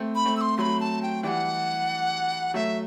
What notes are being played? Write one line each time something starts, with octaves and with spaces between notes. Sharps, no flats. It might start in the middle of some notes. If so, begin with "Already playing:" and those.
Already playing: A3 C4
B5
A3 C4
E6
C6
F#3 A3 B5 C6
A5
G5
E3 G3 F#5 G5
F#3 A3 E5